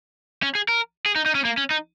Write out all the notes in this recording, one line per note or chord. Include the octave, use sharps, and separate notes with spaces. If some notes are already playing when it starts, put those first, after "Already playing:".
C#4
G#4
A#4
G#4
D#4
D#4
C#4
A#3
C#4
D#4